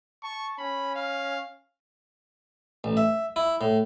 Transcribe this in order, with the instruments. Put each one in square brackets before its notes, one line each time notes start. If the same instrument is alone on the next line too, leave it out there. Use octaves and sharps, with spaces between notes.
[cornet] A5 [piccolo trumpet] C#6
[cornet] C#4 [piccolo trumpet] B5
[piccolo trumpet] F5
[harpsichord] A1
E5
E4
A2